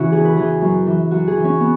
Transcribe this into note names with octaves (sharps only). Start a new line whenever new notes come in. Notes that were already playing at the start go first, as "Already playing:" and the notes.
Already playing: C#3 E3 C#4 E4 F#4
E2 G#4
B4
C#3 E3 G#4
F#2
E3
F#2 F#4
G#4
E3
C#4
B3